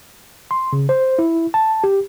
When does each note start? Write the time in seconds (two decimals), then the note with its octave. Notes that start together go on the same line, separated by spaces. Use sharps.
0.51 C6
0.73 C#3
0.89 C5
1.19 E4
1.54 A5
1.84 G4